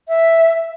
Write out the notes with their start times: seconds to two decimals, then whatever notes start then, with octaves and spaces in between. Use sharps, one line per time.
0.08 E5